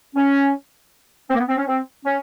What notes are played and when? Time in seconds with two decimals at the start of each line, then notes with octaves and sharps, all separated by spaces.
0.16 C#4
1.29 C4
1.34 A#3
1.38 B3
1.48 C4
1.57 C#4
1.67 C4
2.05 C#4